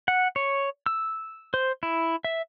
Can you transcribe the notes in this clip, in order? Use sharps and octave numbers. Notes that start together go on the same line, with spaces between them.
F#5
C#5
E6
C5
E4
E5